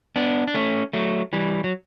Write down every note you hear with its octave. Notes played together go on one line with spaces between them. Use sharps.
B3 D4
D4
A3 C#4
F#3 A3
E3 G3
F#3